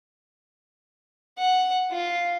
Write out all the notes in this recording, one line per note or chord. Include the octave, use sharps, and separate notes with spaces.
F#5
F4